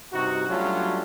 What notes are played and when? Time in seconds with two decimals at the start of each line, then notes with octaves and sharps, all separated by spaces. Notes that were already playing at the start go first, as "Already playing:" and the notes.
0.13 G2 C3 D#4 F#4
0.49 F#3 G3 A3 C#4 D4 F4